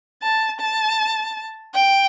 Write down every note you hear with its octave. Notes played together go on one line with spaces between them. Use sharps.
A5
A5
G5